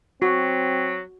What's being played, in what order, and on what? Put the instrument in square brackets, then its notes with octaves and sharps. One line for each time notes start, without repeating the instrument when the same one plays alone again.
[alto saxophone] F#3 [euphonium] C4 [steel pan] F#4